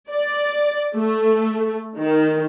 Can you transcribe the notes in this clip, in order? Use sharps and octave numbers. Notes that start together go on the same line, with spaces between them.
D5
A3
D#3